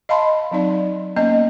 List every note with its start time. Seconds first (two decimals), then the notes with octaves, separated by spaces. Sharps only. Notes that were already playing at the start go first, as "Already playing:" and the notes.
0.09 D#5 F5 A5 B5 C6
0.51 F#3 C4 D#4 D5
1.16 A#3 B3 C#4 D#5